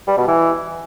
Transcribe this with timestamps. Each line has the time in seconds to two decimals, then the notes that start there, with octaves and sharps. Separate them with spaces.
0.07 G3
0.17 B2
0.28 E3